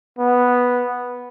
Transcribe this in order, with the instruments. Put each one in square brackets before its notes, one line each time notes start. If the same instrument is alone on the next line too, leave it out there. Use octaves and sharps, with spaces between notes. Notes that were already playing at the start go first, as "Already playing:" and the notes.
[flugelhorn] B3